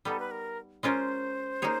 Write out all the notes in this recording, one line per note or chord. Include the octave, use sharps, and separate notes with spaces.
G3 B3 D#4 A4
B4
A#4
G#3 C#4 F4 A#4 C5
A#3 D#4 G#4 C#5